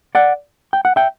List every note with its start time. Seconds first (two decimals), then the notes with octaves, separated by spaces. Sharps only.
0.15 D5 F#5
0.73 G5
0.85 F#5
0.96 E5 G5